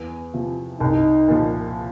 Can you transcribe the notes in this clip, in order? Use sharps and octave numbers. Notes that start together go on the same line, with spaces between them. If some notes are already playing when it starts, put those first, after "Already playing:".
Already playing: E2
C3 F3
C2 D#4
A#2 F3